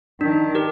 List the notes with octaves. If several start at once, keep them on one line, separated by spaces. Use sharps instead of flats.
D#3 D4
G4 A#4